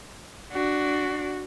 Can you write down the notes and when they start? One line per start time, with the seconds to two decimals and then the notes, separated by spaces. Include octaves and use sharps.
0.52 D4 F#4